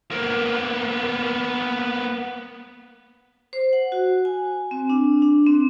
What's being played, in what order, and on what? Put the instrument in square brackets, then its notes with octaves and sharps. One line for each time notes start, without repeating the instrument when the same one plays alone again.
[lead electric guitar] A#3 B3
[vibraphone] C5
F#5
F#4
G#5
C4
D4
D4
C4